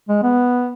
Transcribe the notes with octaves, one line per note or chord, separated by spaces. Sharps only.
G#3
B3